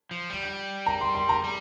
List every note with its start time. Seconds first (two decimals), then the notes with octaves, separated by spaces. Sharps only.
0.11 F3
0.30 G3
0.86 A#5
1.01 C6
1.15 C6
1.29 A#5
1.44 G3